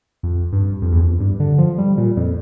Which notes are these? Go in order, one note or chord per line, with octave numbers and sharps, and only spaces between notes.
F2
G2
F2
E2
F2
G2
D3
F3
G3
A#2
F2